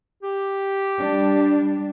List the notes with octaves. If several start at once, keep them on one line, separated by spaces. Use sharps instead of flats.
G4
G3 D4